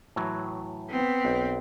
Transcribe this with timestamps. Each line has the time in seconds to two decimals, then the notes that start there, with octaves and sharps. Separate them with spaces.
0.16 A2 E3 F#3
0.90 B3 C4
1.25 B1